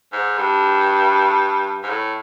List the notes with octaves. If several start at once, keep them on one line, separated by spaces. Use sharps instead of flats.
G#2
G2
G#2
A2